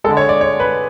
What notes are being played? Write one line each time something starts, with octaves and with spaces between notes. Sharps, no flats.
D3 G#3 A4
C#5
D5
C#5
B4